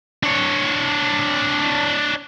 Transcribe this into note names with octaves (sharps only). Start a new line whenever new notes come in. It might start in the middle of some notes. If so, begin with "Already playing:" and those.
D4 C#5